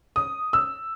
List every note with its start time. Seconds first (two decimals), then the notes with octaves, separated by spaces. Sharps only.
0.16 D#6
0.53 E6